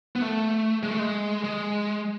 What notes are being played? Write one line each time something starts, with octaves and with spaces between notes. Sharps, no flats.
B3
A3
G#3
A3
G#3
G#3